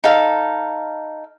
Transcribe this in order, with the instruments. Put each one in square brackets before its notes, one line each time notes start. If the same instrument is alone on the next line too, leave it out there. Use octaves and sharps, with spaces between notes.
[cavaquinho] D#4 A4 F5